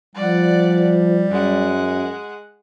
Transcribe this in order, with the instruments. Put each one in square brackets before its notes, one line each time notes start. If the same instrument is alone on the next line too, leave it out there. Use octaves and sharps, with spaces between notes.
[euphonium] F3 [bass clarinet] G3 [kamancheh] D5 F#5
[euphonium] F#2 [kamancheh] G#3 F#5